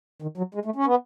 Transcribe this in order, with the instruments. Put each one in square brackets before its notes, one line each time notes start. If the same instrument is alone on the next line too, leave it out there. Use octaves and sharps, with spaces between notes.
[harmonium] D#3
F#3
G#3
A3
C#4
B3